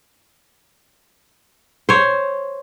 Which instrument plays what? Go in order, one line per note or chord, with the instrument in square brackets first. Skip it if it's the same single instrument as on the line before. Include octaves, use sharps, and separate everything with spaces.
[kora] C5 C#5